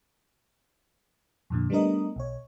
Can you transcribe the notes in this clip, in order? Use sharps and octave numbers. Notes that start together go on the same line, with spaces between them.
F2 A#2 D3
G3 A3 B3 D4 A#4 D#5
B1 C#5